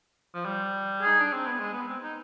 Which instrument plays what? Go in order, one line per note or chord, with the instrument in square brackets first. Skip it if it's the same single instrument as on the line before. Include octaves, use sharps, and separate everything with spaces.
[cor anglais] F3
G3
[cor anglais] D#4 [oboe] G#4
[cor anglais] D4
C4
B3
G#3
B3
C4
D#4